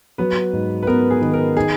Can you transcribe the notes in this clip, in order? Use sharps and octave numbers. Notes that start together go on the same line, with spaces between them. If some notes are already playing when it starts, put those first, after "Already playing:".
F#3 B3 B4
G#2
B4
B3 A#4
G#4
D#3
A#4
D#4 G#4